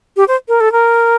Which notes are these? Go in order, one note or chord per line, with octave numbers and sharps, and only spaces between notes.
G4
C5
A#4
A4
A#4